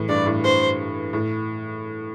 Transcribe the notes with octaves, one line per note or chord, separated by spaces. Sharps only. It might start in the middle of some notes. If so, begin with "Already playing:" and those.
Already playing: A2 E3
G2 D5
A2
G2 C5
A2